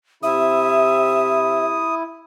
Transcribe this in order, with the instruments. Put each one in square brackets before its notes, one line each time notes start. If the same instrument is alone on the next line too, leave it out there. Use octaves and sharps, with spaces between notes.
[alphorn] C3 [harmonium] E4 [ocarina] E5 [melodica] D#6